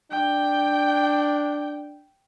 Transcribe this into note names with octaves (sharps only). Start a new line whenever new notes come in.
D4 G5